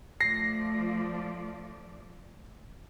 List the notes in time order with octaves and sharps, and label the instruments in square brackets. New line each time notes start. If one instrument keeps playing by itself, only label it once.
[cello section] F3 A3 D5 [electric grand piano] A#6 C7